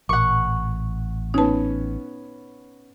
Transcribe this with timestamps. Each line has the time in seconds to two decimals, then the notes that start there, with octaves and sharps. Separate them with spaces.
0.09 A1 A#2 F#5 C#6
1.34 B3 C#4 D#4 A5